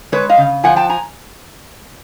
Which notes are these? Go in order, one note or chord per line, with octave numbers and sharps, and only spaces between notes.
G#3 B4 C#5
D#5 F5
C#3
F3 F#5 G#5
G5 A5
G#5 A#5